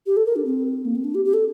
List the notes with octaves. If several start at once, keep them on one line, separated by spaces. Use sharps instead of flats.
G4
A4
A#4
D4
C4
A#3
C4
D4
G4
G4
A4